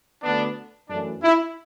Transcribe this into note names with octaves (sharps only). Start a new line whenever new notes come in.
D2 D3 B3 D4
F#2 E3 A3 D4
E4